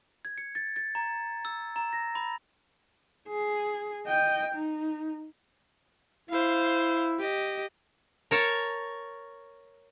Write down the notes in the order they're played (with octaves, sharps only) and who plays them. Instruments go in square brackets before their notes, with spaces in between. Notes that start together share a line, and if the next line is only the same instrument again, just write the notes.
[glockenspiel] G#6
C#7
A6
A6
A#5
E6
A#5
A#6
B5
[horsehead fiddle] G#4
D#5 G5
D#4
[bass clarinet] E4 [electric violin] C5 F5
[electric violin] G4 D#5
[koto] A#4 C#5 A5